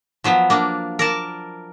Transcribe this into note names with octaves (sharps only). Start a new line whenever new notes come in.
F3 F#3 B3
A#3 D4
A#4 D5 A5